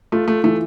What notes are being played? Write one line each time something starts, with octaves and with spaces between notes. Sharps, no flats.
A3 F4
A3
E3 A3